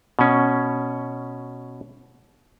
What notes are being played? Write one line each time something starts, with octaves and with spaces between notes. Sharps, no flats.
B2 C#4